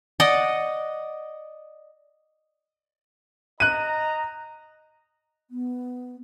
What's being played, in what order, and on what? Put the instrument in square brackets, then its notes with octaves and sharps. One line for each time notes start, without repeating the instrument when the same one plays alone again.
[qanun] D5 D#5 F#5
[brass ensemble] D#5 A#5 [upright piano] F#6 D#7
[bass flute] B3